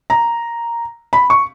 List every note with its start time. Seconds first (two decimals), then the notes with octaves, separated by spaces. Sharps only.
0.10 A#5
1.13 B5
1.30 C#6